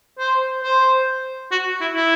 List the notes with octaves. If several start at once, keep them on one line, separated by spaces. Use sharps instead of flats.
C5
C5
F#4
E4
E4